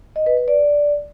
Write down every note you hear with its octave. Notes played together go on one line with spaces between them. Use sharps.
D#5
B4
B4
D5